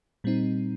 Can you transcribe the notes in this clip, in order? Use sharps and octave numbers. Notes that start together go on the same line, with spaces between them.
A#2 G3 C4 D#4